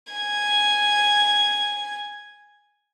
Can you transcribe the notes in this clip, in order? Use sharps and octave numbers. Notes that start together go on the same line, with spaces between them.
G#5 G#6